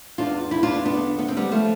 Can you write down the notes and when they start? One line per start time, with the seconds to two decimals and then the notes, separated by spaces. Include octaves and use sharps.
0.18 E2 D4 F4
0.51 E2 E4
0.63 D4 F4
0.85 D3 B3 D4
1.18 F2 B3
1.28 C4
1.37 G3 B3
1.51 F3 A3